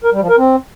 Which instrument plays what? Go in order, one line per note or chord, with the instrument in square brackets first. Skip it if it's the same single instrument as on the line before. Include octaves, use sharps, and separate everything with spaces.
[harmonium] A#4
G3
F3
A#4
C4